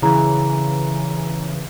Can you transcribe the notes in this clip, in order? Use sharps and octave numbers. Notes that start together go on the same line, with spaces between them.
C#3 E3 E4 G#4 A#5